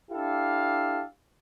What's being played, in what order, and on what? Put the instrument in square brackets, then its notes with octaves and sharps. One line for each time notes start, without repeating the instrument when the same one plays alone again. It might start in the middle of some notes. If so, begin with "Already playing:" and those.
[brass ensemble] D4 E4 G4 A4 F5